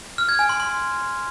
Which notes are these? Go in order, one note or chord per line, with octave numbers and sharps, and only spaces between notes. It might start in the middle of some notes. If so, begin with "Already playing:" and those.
F6
G#6
G#5
C6
C6